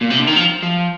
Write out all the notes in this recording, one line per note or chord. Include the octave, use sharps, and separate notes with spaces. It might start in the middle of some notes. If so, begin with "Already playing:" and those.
A#2
C3
D3
D#3
F3
F3